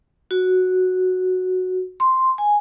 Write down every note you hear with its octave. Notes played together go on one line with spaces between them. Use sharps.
F#4
C6
G#5